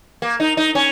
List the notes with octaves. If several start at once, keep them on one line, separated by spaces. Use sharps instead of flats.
A#3
D#4
D#4
C#4